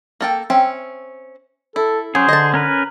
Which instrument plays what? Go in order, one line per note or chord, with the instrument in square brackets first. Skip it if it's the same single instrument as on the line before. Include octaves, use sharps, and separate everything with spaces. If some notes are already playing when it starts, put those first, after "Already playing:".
[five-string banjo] A#3 A4 G5
C4 C#4 E5
[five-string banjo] E4 [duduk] A4
[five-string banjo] F#3 [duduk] C#4 [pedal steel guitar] G#4 C5
[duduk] D3 [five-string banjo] D#5 A5
[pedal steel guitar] C#4 A#4 B4